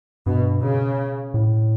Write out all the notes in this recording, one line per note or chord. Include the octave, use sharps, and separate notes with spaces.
G2 B2
C#3
A2